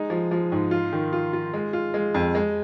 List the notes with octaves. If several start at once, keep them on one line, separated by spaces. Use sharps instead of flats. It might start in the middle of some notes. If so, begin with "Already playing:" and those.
Already playing: G#3 D#4
F3
F3
G#2
F4
D#3
F4
F4
G#3
F4
G#3
F2
G#3